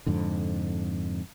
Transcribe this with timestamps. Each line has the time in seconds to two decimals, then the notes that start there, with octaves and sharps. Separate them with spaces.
0.06 F2 G#2 D3